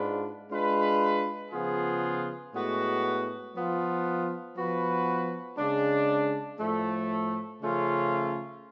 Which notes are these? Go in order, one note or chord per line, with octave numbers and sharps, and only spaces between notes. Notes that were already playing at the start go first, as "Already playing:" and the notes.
Already playing: G#2 G#3 D4 F4 B4
G#3 D4 F4 B4
C#3 F3 B3 F4 G#4
A2 G#3 B3 F#4 B4
F3 B3 F4
F3 B3 F#4 B4
C#3 G#3 D4
A2 F3 A3
C#3 F3 A3 C#4 F4